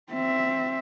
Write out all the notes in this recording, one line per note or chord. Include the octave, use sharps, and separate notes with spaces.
C4 E5